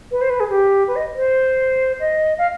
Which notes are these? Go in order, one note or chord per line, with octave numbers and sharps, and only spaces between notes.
B4
C5
B4
G#4
G4
B4
D#5
C5
D#5
F5